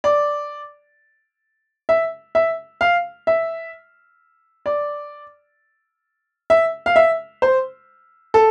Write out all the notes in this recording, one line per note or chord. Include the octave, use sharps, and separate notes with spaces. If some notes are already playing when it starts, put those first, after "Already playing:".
D5
E5
E5
F5
E5
D5
E5
F5
E5
C5
A4